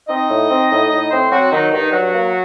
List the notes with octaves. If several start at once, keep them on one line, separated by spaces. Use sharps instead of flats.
C4 D#4 D#5
A2
C4
A2
A2
A2 C4 C5
F#3 C4 F#4
D#3 F#3 D#4
G2 D#3 D#4
G2 F#3 F#4
A#3